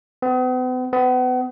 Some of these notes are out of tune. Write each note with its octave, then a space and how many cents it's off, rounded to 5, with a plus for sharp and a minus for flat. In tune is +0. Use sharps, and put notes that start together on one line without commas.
B3 +45
B3 +35